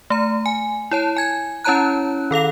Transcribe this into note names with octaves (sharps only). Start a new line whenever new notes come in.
A3 A#5
G#5
E4 C#5 A5
G#5 G#6
C#4 E4 C#5 A5 A#5 F#6
D#3 A4 F5 F7